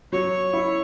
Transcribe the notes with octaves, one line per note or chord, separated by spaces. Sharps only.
F#3 C#5
E4